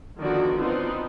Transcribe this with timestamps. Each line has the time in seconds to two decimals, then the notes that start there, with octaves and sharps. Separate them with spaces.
0.21 D3 D#3 F3 B3 F#4 D5
0.57 B3 C4 D4 D#4 F4 B4